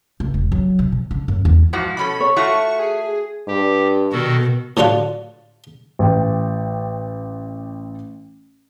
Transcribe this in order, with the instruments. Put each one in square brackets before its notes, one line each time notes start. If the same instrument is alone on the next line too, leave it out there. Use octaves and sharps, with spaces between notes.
[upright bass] F1
E1
F#3
B2
F3
D3
F#2
E2
[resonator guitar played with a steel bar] G#2 F3 F#4
[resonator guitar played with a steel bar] B2 C#4 A4 [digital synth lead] B5
[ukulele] C#5
[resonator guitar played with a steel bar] A3 F4 F#4 [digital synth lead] C#6
[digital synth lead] G#4
[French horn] G2 [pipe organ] G4
[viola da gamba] B2 [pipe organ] D#3 F#4 A4
[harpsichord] A2 D3 A3 F4 F#4
[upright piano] A1 G5